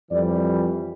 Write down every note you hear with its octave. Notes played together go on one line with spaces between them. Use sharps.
F2 E3 G3 D5